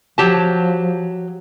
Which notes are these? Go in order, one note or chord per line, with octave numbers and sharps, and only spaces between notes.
F3 F#3 G4 A5